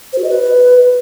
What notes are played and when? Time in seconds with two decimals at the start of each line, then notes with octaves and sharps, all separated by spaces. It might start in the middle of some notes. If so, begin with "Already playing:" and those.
0.13 C5
0.18 F#4
0.24 D#5
0.29 B4